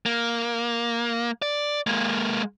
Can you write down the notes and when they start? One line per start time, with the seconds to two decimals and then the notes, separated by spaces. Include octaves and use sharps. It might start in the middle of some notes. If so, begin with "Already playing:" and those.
0.06 A#3
1.42 D5
1.87 G#3 A#3